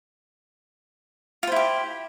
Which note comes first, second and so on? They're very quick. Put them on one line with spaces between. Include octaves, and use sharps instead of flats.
F4 C5 E4 G4